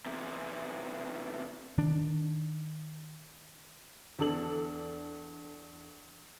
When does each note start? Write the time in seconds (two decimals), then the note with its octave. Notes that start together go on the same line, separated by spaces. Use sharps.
0.06 E2 C3
1.78 D#3 D4
4.19 E2 D4 A4 F#7